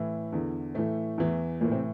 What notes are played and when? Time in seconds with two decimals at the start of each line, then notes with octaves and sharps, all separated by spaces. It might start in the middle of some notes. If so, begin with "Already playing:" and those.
Already playing: A2 E3 E4
0.32 E2 D3
0.75 A2 E3 A3
1.18 E2 E3
1.61 A#2 E3 A#3
1.64 A2
1.72 C3 C4